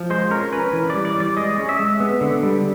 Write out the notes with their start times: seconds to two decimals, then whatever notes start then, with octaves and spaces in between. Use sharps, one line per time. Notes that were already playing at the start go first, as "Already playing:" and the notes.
Already playing: F3
0.10 G#3 C5
0.30 C#4 A#4
0.53 C#4 B4
0.73 E3
0.90 G3 D5
1.05 D5
1.16 G3 D5
1.36 G#3 D#5
1.58 C#4
1.69 E5
1.79 G#3
2.00 B3
2.21 D3
2.43 G3